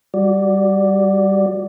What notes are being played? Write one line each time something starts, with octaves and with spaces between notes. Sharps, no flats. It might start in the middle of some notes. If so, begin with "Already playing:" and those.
G3 F#4 D5